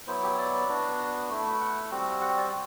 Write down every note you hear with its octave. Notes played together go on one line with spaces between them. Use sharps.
F#3 B3 E4 C5
G4
D5
B3 D4 F#4
A3 E4
F#5
G3 C4 F#4
F#5
D5